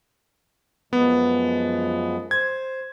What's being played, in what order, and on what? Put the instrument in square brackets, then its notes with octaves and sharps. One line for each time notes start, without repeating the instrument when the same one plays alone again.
[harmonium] F#2 F3 G#3 [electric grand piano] B3
[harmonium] C5 [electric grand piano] G#6